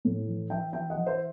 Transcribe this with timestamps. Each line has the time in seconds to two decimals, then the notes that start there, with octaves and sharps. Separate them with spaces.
0.05 A2
0.27 E3
0.50 E3 E5 G5
0.73 E3 E5 G5
0.90 D#5 F#5
0.96 E3
1.07 C5 E5